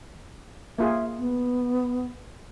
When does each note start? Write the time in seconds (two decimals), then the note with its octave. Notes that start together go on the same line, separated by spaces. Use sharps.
0.78 A#3 F4 G#4 E5
1.19 B3